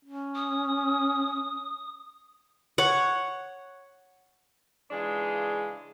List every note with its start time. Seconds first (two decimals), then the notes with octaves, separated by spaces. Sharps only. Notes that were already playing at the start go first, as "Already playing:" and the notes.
0.05 C#4
0.35 D#6
2.78 C#5 F#5
4.91 C#3 E3 G#3 D4 F4 G#4